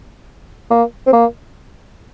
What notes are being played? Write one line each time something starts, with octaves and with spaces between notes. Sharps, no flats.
A#3
C4
A#3